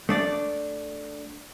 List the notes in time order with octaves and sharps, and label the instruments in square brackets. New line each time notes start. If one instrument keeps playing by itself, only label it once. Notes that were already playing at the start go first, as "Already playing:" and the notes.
[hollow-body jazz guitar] A3 D4 D5